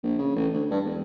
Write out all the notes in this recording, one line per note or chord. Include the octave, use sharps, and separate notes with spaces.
A#1
C#3
A1
D2
G2
E1